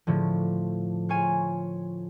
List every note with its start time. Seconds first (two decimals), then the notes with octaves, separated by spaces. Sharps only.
0.07 A2 D3 F3
1.09 F4 C#5 G#5